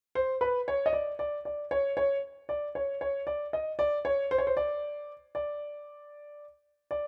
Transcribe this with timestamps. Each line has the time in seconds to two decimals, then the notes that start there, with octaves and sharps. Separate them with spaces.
0.15 C5
0.41 B4
0.68 C#5
0.86 D#5
0.93 D5
1.19 D5
1.45 D5
1.71 C#5
1.97 C#5
2.49 D5
2.75 C#5
3.01 C#5
3.27 D5
3.53 D#5
3.79 D5
4.05 C#5
4.31 C5
4.38 C#5
4.47 C5
4.57 D5
5.35 D5
6.91 D5